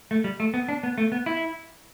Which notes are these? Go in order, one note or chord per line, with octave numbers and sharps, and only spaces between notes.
A3
G3
A3
B3
D4
B3
A3
B3
E4